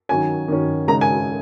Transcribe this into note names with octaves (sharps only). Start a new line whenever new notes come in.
D#3 F#3 C#4 G#5
D#3 F#3 C#4
C#3 G#3 D#4 A#5
G#5